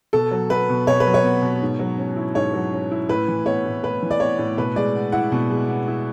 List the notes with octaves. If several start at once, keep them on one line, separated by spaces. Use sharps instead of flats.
B2 A4
F#3
B3 B4
B2
B2 C#5
B4
F#3
C#5
B3
B2
G#2
F#3
C#4
E4
G#2 C#5
F#3
C#4
E4
A2 B4
E3
B3 C#5
A2
A2 B4
E3
D5
B3 C#5
A2
B2 B4
G#3 D5
B3
E4 F#5
B2
G#3
B3
E4